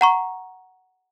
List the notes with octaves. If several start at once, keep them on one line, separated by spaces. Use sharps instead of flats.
F#5 A#5 C#6